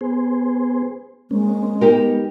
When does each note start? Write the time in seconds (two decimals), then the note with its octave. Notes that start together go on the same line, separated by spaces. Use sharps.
0.01 B3 G#4 C5
1.31 G#3 A#3 C4 C#4
1.81 B3 D#4 G4 A#4